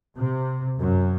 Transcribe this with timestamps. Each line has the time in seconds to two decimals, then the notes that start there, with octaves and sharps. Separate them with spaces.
0.17 C3
0.77 F#2